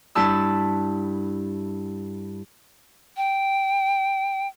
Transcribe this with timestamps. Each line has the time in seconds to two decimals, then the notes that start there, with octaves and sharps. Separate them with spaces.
0.15 G2 E4 A5 E6
3.17 G5